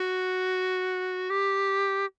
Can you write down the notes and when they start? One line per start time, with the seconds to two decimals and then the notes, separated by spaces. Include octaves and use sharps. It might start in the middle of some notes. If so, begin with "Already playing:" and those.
Already playing: F#4
1.30 G4